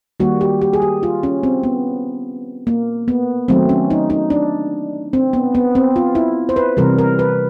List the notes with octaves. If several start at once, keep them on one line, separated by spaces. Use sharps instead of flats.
D#3 G3 A#3 F#4
G4
G4
G#4
G4
F4
C#4
C4
B3
A#3
B3
D#3 F#3 A3 C4
C#4
D#4
D#4
D4
C4
B3
B3
C4
F4
E4
C5
B4
C3 E3 G3 A#4
A#4
B4